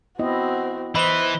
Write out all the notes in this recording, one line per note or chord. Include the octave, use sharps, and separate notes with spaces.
B3 C4 E4 F#4 D#5
E3 C5 D#5 B5 G7